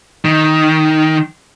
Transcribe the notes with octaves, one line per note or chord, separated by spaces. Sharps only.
D#3